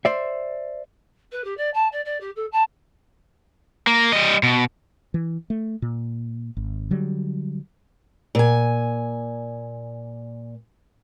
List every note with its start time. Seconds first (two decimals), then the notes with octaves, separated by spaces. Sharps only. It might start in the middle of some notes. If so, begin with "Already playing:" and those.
0.05 C5 D5 E5
1.31 B4
1.44 G4
1.57 D5
1.73 A5
1.92 D5
2.05 D5
2.20 G4
2.36 A4
2.51 A5
3.87 A#3
4.12 G3 D#5
4.43 B2
5.14 E3
5.50 A3
5.82 A#2
6.57 G#1
6.90 D3 F#3 G3
8.35 A#2 G#5